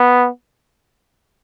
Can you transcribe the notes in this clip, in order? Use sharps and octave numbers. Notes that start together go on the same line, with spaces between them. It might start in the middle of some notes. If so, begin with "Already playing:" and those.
Already playing: B3